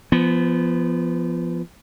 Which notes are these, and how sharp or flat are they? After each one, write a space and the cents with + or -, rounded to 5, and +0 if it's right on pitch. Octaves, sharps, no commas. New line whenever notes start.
F3 -25 B3 +0